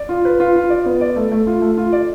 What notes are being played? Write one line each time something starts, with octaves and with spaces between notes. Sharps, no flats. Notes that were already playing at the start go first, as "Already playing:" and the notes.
Already playing: D5
F4
B4
F4
F4
D5
B3
D5
A3
A3
F4
A3
F4
D5